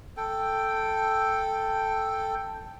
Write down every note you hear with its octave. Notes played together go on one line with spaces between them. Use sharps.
A4 G5